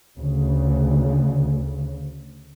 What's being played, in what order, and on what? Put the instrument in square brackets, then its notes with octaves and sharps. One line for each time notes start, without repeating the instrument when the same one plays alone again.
[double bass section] D2 C#3